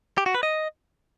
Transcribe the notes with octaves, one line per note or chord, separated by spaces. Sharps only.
G4
F#4
B4
D#5